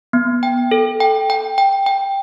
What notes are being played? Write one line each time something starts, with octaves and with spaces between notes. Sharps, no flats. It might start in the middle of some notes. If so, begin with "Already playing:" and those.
B3
G5
A4
G5
G5
G5
G5